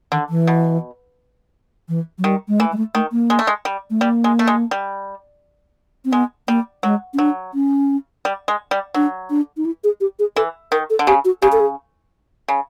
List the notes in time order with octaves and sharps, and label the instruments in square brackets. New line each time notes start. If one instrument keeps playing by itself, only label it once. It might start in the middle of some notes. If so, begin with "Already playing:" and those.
[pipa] D3 [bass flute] D#3
[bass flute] E3
[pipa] B2
[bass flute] E3
F#3
[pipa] D#3 [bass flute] G3
[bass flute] G#3
[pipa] E3 [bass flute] A3
[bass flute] G#3
A3
[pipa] D#3 [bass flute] A3
[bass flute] A#3
[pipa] G#3
A3
G#3
G3
[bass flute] A3
[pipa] G3 [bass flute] A#3
[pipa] G#3
A3
G#3
G3
[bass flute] C4
[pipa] G#3 [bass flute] B3
[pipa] G3 [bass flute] A#3
[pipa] F#3 [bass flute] G#3
[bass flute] C#4
[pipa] F#3 [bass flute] D4
[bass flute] C#4
[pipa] G3
G#3
G3
[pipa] F#3 [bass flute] D4
[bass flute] D4
D#4
E4
G#4
G4
G#4
[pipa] E3 [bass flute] A4
[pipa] D#3 [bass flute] A#4
[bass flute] A4
[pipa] D3
[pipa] C#3 [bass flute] G4
[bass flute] F#4
[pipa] C#3 [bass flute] G4
[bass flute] A4
G#4
[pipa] C#3